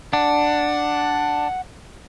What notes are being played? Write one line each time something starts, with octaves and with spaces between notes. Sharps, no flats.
D4 F#5